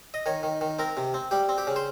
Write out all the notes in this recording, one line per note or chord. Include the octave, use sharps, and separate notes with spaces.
D#5
D#3 C#5
D#3
D#3
C4 A#4
C3
C4
G3 G4
C4
G4
C#3
C5